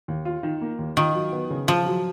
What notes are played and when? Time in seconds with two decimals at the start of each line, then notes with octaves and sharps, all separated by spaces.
0.08 D#2
0.25 F4
0.43 D#3
0.62 A#3
0.79 D#2
0.97 D#3 F4
1.14 F#3
1.32 B3
1.50 C#3
1.67 F3 F4
1.86 F#3